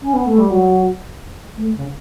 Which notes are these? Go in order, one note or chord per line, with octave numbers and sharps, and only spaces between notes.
C#4
B3
A3
G3
F#3
A3
C#3